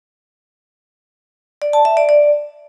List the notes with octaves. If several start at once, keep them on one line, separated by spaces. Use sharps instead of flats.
D5
A5
E5
D5
D5